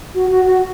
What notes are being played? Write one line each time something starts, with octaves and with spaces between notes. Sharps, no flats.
F#4
F#4
F#4